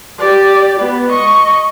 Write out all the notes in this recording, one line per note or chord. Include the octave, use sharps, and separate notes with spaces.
G4 D5
B3
D#5 C#6